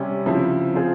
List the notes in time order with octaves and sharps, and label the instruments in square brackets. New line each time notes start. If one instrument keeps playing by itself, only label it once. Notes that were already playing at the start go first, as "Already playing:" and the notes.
Already playing: [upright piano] C3 G3 C#4
C#3 F3 C4 E4
F3 C4 F4 G#4 C5